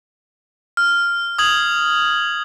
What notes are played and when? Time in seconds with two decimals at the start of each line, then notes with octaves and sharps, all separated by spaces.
0.77 F6
1.39 D#6 G#6 F#7